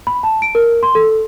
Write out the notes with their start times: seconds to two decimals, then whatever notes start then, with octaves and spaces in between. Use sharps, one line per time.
0.07 B5
0.23 A5
0.42 D7
0.55 A#4
0.83 C6
0.95 A4